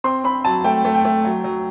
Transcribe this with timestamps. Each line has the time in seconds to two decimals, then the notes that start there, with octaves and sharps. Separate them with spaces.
0.04 C4 C6
0.24 C4 B5
0.45 F#3 A5
0.64 A3 G5
0.85 A3
0.94 G5
1.05 A3
1.25 F#3
1.44 F#3